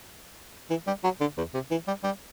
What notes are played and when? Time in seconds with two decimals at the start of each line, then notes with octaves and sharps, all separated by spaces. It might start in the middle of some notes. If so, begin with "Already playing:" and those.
0.70 E3
0.87 G3
1.04 F#3
1.20 D3
1.37 E2
1.54 C3
1.71 E3
1.87 G3
2.04 G3